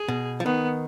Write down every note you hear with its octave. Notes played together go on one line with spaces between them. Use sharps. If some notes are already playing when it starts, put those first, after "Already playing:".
Already playing: G#4
B2
F3
D#3 B3